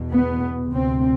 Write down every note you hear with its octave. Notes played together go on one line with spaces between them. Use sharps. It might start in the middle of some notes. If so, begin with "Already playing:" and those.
Already playing: E2 B2
B3
D2 C3 C4